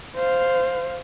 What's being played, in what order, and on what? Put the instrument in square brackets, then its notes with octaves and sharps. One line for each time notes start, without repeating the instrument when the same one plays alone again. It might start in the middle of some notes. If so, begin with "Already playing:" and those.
[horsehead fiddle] C5 F5